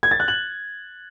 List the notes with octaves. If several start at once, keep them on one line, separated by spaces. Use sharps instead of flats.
G#6
A6
F#6
F#7